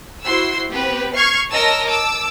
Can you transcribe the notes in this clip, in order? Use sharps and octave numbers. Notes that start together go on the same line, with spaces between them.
E4 F#4 C5 C6 E6
B3 C4 G4 B4
C#6 F6 G#6 C7
A#4 C#5 D#5 A5 E6 A#6
A5 D6 E6